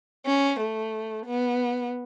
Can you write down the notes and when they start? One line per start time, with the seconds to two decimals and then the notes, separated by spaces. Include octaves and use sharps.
0.26 C#4
0.60 A3
1.26 B3